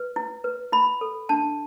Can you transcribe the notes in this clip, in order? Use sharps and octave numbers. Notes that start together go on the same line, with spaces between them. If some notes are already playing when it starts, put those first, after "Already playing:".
Already playing: B4
E4
B4
E4 B5
A4
D4 A5